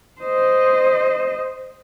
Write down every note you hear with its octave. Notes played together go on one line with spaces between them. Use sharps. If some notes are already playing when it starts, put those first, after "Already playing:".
C5 D#5